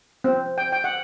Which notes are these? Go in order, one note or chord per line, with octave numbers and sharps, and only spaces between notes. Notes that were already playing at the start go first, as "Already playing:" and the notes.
C4
G5
G5
F#5